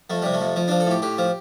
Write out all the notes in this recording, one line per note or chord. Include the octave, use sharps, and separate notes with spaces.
F2 A3
C3 G3
A3
F2
F3
F3 D4
A4
A2 G4
A2 G4
F3